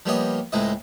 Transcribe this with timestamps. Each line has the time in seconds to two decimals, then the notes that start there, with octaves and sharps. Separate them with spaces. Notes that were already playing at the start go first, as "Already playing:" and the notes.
0.06 F3 G3 A#3 B3 C#5 D#5
0.52 C#2 A2 G#3 C4 E4 D#5